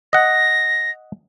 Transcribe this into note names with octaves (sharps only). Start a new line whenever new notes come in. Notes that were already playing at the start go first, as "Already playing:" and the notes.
D#5 F#5 A#6